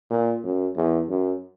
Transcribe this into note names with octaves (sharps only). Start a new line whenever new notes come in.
A#2
F#2
E2
F#2